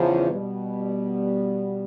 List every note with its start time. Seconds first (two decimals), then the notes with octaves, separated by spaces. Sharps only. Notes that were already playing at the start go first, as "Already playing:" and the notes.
Already playing: E2 C#3 F3
0.31 B2 G3 B3